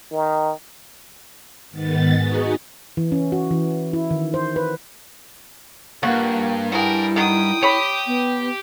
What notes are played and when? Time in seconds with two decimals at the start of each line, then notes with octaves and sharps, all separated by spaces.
0.11 D#3
1.71 G#2 D#3 B3 A6
2.17 B3 D#4 F#4 G#4
2.97 E3
3.12 C#4
3.32 F#4
3.51 E3
3.93 E4
4.11 D#3
4.34 C5
4.56 B4
6.03 D2 G2 F3 A#3 F#4
6.72 E4 F#4 G#4 A#4 G5
7.16 D#3 F#3 G5 D#6
7.63 G4 C#5 B5
8.06 B3